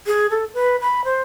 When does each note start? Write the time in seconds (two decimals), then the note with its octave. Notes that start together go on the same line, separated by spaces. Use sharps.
0.07 G#4
0.30 A4
0.54 B4
0.81 B5
1.05 C5